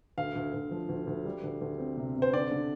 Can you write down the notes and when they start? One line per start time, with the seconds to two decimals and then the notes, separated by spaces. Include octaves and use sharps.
0.18 D2 F5
0.36 D2
0.54 D2
0.71 F3
0.89 D2
1.07 D2
1.25 G3
1.43 D2
1.61 D2
1.79 C4
1.97 C3
2.16 C3
2.22 C5
2.33 D3 D5
2.51 D3